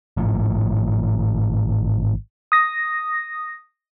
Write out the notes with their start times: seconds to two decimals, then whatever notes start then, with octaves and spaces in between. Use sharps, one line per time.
0.17 G#1 A2 F3
2.52 D#6 A#6